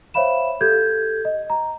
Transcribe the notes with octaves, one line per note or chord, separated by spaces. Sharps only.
C5 C#5 E5 F5 B5 E7
G4 A4 G6 G#6
D#5
A#5